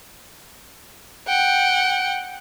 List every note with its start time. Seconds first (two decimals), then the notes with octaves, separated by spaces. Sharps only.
1.28 F#5 G5